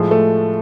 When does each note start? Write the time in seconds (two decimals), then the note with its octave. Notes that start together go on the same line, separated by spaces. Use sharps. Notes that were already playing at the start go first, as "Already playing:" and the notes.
Already playing: A2 F3 G#3
0.11 A3